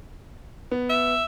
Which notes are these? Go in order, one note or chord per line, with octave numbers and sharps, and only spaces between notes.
B3
E5